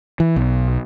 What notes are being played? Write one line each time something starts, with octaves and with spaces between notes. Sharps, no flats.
E3
B1